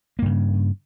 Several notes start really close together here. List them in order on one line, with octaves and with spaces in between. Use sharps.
A#3 G2 C#3